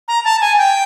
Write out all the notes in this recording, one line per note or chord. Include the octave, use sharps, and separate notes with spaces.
A#5
A5
G#5
G5